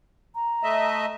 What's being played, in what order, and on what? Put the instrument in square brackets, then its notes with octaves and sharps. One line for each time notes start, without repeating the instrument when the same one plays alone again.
[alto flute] A#5
[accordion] A3 D#5 E5